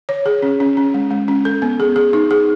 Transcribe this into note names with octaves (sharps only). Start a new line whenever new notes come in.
C#5
G#4
C#4
C#4
C#4
G#3
G#3
C#4
A4
B3
G#4
G#4
D#4
G#4